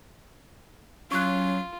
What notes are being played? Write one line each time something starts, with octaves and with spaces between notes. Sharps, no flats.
F#3 C#4 F4 C#6 F#6